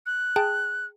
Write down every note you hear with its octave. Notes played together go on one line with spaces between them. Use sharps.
F#6
G#4 G5 A5